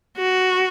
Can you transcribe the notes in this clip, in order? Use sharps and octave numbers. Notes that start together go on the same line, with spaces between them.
F#4